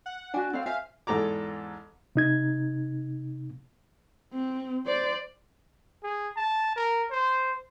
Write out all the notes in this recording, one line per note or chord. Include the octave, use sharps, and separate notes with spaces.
F#5
D4 F#4 G#5
C4 A4 C#5 F5
C5 E5 F5 G#5
E2 G#2 A4 A#5 D6
C3 D#4 G#6
C4
C5 D5
G#4
A5
A#4
C5